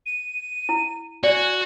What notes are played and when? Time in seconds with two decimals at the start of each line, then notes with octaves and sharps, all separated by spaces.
0.06 D#7
0.69 E4
1.24 F#4 D5 G#5